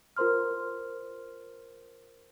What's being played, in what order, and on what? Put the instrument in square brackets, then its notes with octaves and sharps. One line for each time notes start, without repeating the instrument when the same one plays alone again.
[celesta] F4 A#4 C5 C6 F6